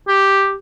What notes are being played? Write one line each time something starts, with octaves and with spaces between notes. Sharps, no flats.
G4